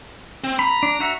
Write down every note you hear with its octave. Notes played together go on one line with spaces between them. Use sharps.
C4
A#5 B5
D4
F#4 E5 F#5